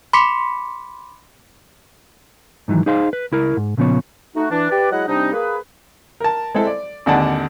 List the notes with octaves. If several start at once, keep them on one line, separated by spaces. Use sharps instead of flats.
B5 C6 D6 B6 C#7
G#2 D#3 E3 F#3
D#4 G#4 C5 F5 C6
B4
C#2 E4 A#4
G#2
A#2 C#3 F3 B3 C#5
A3 D#4 F#4
E3 D4
G4 B4 D5
F#3 G#3 E4 D#5 F#5
C3 G3 C4 D4 D#4
A#3 G#4 B4
A#4 A5
G#3 C4 E4 A4
D5
G#1 D#2 D3 D4 F#5 A5